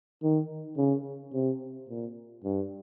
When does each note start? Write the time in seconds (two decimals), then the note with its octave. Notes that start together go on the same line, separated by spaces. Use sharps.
0.23 D#3
0.78 C#3
1.34 C3
1.89 A#2
2.44 G2